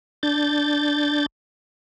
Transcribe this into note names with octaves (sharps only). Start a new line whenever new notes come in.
D4 G6 A6